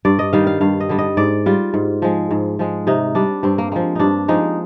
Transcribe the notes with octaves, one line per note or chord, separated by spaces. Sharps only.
G2 D5
D#5
D#3 G3 F5
F5
G2 F5
D#5
D3 G3
D#5
G#2 D5
G3 F4
G#2
F3 G#3
G#2
F3 G#3
C3 D#4
G3 D4
G2 C4
A#3
F3 G#3 A#3
G2 D4 D#4
F3 G#3 D#4